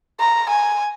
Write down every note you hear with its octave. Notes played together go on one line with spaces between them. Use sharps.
A#5
G#5